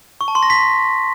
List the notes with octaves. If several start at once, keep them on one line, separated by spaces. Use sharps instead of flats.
C#6
A5
C6
A#6
B6